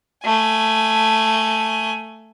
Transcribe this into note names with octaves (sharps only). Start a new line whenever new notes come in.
A3 G#5